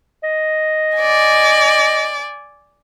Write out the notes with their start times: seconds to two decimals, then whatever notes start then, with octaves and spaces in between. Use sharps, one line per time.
0.24 D#5
0.97 D5 G#5